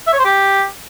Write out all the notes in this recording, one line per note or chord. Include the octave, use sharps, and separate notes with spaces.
E5
C#5
C5
G4